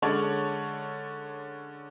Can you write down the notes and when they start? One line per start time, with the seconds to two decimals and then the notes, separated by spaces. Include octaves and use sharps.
0.02 D3 G#3 C#4 A4 C#5 D5